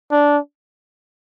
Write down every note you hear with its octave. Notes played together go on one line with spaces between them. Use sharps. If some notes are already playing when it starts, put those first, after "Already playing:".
D4